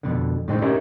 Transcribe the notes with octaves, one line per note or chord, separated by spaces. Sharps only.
F2 B2 D3
A2 D3 G#3 C4 C#4 D#4
C#4 D#4 G4 A#4 C#5 E5